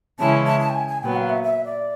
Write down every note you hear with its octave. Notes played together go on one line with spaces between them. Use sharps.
C#3 E3 G#3 C#4 E4 A5
A5
A5
G5
G#5
G#5
A#2 F#3 B3 G5
F5
E5
E5
D5